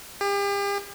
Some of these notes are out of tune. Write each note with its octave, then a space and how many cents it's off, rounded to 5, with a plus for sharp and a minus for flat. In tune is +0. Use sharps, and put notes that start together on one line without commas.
G4 +40